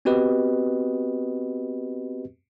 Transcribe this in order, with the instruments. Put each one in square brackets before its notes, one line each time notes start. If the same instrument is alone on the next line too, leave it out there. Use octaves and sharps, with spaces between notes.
[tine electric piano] B3 C4 F#4 G4 B4 D#5